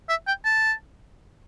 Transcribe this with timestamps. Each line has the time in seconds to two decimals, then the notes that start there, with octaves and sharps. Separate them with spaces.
0.09 E5
0.27 G5
0.45 A5